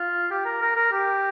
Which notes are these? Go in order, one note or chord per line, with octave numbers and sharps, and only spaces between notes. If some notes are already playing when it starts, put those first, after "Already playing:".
Already playing: F4
G4
A#4
A#4
A#4
G4